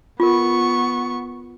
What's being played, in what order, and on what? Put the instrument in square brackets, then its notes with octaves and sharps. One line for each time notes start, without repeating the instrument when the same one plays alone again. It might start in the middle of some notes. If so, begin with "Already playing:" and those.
[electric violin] B3 C#6 [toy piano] F4 A#4